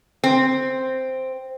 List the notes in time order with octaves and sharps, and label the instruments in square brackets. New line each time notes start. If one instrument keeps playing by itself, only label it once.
[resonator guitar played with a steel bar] C4